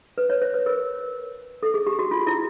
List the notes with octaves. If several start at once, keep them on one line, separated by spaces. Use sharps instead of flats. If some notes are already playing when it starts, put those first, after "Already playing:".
B4
C#5
C5
B4
A#4
A4
G#4
G4
F#4
F4
E4